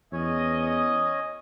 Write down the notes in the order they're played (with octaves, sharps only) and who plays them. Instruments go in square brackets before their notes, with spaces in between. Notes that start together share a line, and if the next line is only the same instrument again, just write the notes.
[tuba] E2 [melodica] C#4 C#5 [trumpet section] D#5